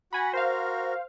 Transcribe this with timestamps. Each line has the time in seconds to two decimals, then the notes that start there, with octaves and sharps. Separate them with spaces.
0.13 F#4 F#5 G#5 B5
0.33 F#4 A#4 C5 F5